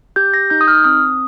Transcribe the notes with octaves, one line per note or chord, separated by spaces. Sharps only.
G4 G6
A#6
D#4 G6
D#6
F6
C4 D#6